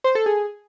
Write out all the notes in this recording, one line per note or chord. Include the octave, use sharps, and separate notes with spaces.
C5
A4
G#4